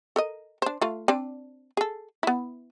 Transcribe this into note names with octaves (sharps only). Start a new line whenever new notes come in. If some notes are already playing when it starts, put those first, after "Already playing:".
A4 A#4 D#5
D4 C5
A3 F4
C4 D4 D5
G#4 A4
B3 E4